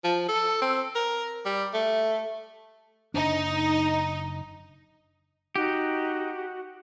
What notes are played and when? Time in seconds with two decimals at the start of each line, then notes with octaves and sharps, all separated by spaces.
0.04 F3
0.28 A4
0.62 C4
0.95 A#4
1.45 G3
1.73 A3
3.14 F#1 D4 D#4
5.56 D#4 F#4 G4